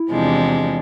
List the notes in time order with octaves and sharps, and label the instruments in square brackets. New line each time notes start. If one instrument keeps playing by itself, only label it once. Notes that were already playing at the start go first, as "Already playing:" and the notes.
Already playing: [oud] E4
[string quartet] E2 C3 F3 G#3 D4